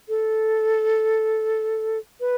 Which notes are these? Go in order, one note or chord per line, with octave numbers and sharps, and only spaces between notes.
A4
B4